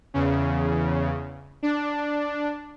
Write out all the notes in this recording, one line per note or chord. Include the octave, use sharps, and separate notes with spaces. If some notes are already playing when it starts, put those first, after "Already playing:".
E2 C#3
D4